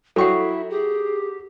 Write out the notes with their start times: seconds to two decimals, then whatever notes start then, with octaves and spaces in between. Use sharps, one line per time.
0.16 F#3 E4 A4 E5 F#5 G5 C#6
0.70 G4 G#4